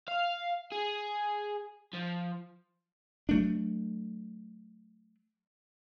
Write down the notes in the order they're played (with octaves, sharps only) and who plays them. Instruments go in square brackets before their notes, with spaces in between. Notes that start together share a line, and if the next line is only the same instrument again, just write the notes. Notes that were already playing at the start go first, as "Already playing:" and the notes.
[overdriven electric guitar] F5
G#4
F3
[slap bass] F#3 A3 D4